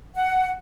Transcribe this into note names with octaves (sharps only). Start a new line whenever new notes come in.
F#5